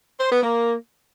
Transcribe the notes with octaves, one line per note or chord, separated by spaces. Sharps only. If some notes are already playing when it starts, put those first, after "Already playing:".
C5
B3
A#3